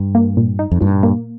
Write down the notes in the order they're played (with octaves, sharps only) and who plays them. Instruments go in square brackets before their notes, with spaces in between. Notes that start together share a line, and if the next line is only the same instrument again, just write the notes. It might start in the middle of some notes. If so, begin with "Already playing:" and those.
Already playing: [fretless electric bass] G2
[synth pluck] A#3
A#2
D#4
[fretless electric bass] F2
[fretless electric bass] G2 [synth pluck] A#2
[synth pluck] A#3